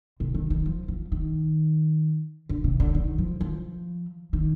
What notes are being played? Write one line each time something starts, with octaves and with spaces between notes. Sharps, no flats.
C3
D#3
D#3
F3
F3
D#3
D3
C3
D3
D#3
F3
F3
D#3